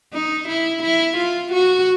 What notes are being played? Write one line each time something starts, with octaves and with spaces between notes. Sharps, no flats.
D#4
E4
E4
F4
F#4